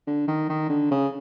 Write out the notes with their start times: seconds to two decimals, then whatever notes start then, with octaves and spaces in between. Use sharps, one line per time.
0.07 D3
0.28 D#3
0.49 D#3
0.69 D3
0.91 C#3